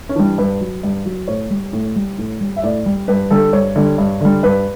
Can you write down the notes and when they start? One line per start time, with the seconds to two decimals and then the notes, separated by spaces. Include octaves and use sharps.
0.09 C#4
0.16 E3 G3 D4
0.38 G2 B4
0.61 F#3
0.83 G2
1.06 F#3
1.28 A2 C#5
1.50 G3
1.73 A2
1.96 G3
2.18 A2
2.41 G3
2.56 E5
2.63 A2 D5
2.86 G3
3.08 G2 B4
3.30 D3 G3 A4
3.53 G2 C#5
3.76 D3 G3
3.98 G2
4.21 D3 G3
4.43 G2 B4